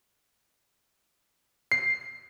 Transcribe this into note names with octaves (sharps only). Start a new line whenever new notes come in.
C7